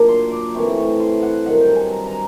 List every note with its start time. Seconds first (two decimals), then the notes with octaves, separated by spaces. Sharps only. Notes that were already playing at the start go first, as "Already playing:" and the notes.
Already playing: A#2 F#3 A#3 D4
0.09 C6
0.31 D6
0.55 E3 A3 C4 E4 C#6
0.77 C#6
1.00 C6
1.22 F#5
1.46 G2 D#3 F#3 F#5
1.61 G5
1.76 G#5
1.91 A#5
2.07 A#5